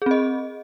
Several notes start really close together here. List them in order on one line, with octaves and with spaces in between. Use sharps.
G#4 C4 D#5